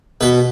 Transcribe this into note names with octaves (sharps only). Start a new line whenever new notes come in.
B2 B4